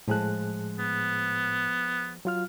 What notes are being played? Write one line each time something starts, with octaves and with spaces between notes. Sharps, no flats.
A2 F3 G#3 G#4 A5 F#6
B3
F#3 F4 F6